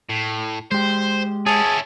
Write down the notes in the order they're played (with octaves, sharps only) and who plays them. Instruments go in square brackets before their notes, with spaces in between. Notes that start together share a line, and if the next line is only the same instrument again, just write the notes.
[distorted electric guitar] A2
[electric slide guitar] G#3 G4 [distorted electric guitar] C5
[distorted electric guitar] C#4 E4 [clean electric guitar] G#4 [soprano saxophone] A5